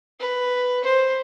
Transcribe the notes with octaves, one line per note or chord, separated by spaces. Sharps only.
B4
C5